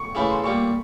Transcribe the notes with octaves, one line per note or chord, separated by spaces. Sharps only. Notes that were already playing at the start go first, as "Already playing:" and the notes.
Already playing: C#6
C#3 E3 A3 B5
C6
A#2 G3 A#3 C#6